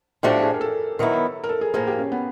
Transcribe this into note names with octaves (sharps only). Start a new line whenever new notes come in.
A2 F3 A3 D4 F#4 G4
G#4
A#4
A4
D#3 F#3 B3 E4
A#4
A4
G#4
A2 F3 A#3 G#4
G4
C#4
B3